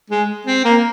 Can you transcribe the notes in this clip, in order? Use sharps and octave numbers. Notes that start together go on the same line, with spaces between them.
G#3
C4
A#3